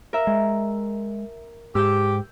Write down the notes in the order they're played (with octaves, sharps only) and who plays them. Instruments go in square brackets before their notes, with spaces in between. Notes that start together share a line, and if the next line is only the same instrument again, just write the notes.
[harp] A#4 E5
[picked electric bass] G#3
[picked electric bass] G#2 [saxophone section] G4 [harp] E6 G6